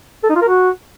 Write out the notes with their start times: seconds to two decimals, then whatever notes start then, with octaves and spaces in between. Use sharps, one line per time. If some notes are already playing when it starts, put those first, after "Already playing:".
0.23 A4
0.29 D#4
0.36 F4
0.42 A#4
0.48 F#4